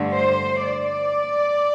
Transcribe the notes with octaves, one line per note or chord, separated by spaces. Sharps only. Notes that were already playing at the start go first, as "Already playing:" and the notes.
Already playing: G2 D3 A3
C5
D5